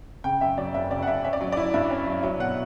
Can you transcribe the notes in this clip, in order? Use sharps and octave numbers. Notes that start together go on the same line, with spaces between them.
C#3 G5
F#2 E5
F#3 D5
F#1 E5
C#3 D5
F#5
F#2 E5
C#4 E5
D5
F#3
E4 D5
G2 E5
C#4
F#3
F#3 E5
B2 F#5